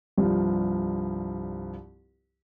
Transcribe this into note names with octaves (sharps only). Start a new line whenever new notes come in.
C2 G2 F3